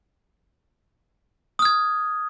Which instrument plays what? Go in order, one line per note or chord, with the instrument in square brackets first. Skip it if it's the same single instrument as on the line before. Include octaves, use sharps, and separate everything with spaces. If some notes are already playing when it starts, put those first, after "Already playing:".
[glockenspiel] D#6
F6
G#6